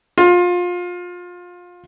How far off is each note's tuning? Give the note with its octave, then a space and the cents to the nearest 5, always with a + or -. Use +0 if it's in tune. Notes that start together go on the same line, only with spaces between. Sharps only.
F4 +25